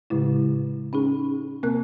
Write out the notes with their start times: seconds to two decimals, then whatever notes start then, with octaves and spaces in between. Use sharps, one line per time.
0.10 A2 C#3 G#3 E4
0.93 C#4 D#4 G#4
1.63 C3 A#3 C4 A#4 F#6